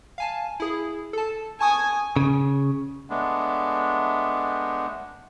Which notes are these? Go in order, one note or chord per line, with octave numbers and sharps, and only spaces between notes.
F5 G#5 A5
E4 G#4
A4 A5
G#5 A5 C#6 D#6
C#3
G#3 A3 B3 D4